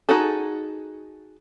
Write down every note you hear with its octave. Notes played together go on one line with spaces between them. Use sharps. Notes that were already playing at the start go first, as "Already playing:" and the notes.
D#4 F#4 G#4 A4